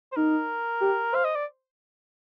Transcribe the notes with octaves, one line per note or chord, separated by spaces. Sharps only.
C5
D#4 A#4
G4
C5 F5
D#5
D5